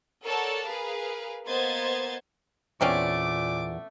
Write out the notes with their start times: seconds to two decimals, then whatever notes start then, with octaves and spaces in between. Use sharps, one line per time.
0.24 A4 A#4 C#5 D5 F#5 A5
0.66 G#4 A#4 B4 F5
1.46 A#3 B3 C5 D#5 G#6 A6
2.81 E2 A#2 A3 C4 C#4 D5 D6